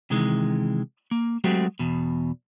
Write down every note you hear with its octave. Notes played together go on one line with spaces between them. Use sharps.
C3 D#3 E3 G#3
A#3
F#3 G#3 A3 C4 F#4 G4
E2 B2